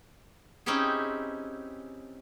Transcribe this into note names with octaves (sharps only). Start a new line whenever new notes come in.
C4 C#4 D#4 E4 G4 G#4